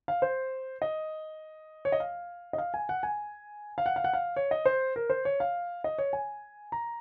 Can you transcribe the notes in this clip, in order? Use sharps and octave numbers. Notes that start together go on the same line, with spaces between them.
F5
C5
D#5
C#5
D#5
F5
D#5
F5
G#5
F#5
G#5
F5
F#5
F5
F#5
F5
C#5
D#5
C5
A#4
C5
C#5
F5
D#5
C#5
G#5
A#5